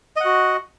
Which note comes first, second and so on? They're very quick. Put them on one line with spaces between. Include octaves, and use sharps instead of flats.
D#5 F#5 F#4